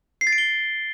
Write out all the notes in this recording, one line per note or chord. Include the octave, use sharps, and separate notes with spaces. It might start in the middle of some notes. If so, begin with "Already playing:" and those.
C7
A6
D7
G7